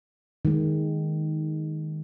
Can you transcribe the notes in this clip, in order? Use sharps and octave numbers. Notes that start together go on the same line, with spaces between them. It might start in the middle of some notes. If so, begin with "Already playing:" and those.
D#3 G#3